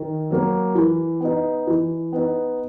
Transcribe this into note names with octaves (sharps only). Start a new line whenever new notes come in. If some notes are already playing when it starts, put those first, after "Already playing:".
Already playing: D#3
F#3 A#3
E3
B3 D#4
E3
B3 D#4